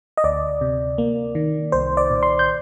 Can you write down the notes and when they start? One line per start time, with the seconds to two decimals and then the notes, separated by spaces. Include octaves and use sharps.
0.17 D#5
0.24 D2 D5
0.61 C3
0.98 A#3
1.35 D#3
1.72 C2 C5
1.97 D5
2.10 A#2
2.23 C6
2.39 G6